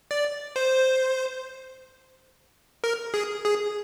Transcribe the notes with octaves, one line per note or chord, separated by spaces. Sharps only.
D5
C5
A#4
G#4
G#4